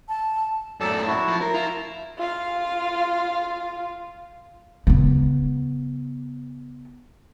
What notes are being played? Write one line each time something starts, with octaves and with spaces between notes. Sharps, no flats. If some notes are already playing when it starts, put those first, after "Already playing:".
A5
F#2 A2 A4 D5 A5
E4 F#4
F3
A#4
E4 F4 A#5 C6
F4 F5
C#3 B3